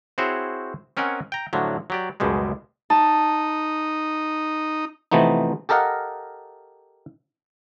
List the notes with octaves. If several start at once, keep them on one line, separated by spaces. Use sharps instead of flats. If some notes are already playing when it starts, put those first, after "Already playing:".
C4 E4 F#4 G#4 C5 C#5
C4 C#4 A#4 D#5 F#5 G#5
G5 A#5
A2 D3 F3 F#3
F#3 G4 D5
C#2 F#2 B2 G3 G#3
D#4 A5
C3 E3 F3 A3 B3 D#4
G4 A4 A#4 D#5 F5 F#5